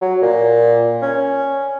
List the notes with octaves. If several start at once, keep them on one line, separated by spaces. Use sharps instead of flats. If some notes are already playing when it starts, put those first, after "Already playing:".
F#3
A#2
C#4